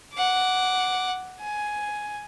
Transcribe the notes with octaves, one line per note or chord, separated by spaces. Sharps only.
F#5 D6
G#5